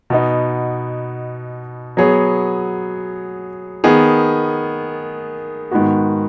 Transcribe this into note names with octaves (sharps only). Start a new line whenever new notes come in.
B2 B3 D#4
F#3 B3 G#4 C#5
D#3 B3 G#4
G#2 D#3 B3 F#4